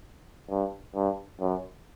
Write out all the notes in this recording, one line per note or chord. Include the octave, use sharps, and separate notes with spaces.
G2
G2
F#2